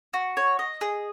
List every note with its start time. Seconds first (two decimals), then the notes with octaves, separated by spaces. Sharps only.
0.14 F#4
0.37 C#5
0.59 D#5
0.81 G#4